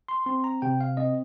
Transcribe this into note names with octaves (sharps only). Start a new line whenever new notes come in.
C6
C4 C6
A#5
C3 G5
F5
C4 D#5